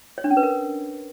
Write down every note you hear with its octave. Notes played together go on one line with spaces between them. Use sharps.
C#5
D4
C#4
B4
A#4